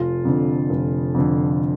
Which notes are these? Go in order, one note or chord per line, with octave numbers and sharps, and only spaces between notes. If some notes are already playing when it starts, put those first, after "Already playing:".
Already playing: F1 F4
F2 D3
F1
F2 D3